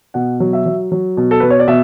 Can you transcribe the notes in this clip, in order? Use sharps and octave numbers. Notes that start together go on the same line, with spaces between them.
B2 F#5
F#3
E5
F#3
F#3
B2
A4
B2 B4
C#5
D5
B2 E5